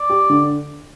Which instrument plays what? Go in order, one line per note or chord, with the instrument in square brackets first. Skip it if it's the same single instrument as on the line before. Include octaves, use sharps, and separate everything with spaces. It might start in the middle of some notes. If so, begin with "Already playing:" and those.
Already playing: [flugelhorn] D5
[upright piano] G4
D3